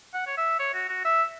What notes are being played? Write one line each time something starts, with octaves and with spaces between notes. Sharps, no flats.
F#5
C#5
E5
C#5
F#4
F#4
E5